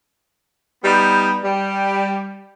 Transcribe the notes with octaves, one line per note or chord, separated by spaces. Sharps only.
G3 B3 D#4
G3